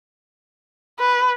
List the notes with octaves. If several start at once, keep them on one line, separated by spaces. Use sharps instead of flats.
B4